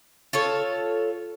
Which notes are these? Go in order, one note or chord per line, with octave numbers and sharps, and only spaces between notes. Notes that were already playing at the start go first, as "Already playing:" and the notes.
F4 A4 C#5